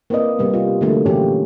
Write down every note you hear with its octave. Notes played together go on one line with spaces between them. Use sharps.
A#3 C4 E4 B4 D5 D#5
C3 G3 A#3 B3
F4 G4 D#5
D3 F3 F#3 A3 A#3 C#4
A#2 D3 E3 C#4 G4